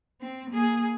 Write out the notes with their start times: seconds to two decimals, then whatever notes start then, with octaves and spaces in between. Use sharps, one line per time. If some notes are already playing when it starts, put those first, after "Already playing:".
0.21 C4
0.50 A#3 G#4